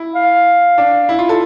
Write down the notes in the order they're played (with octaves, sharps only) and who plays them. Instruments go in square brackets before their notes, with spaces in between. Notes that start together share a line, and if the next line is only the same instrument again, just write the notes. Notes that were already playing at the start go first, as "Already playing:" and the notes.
Already playing: [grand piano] E4
[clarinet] F5
[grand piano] D4
E4
F4
A4